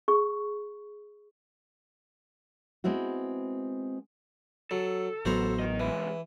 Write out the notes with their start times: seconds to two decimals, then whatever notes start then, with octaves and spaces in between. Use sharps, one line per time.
0.08 G#4 C#6
2.84 G#3 B3 C4 E4 F#4
4.71 F#3 A4
5.25 A1 F#3 B3 F#4 C5 A#5
5.59 A#4 D#5
5.80 C2 E3 G#3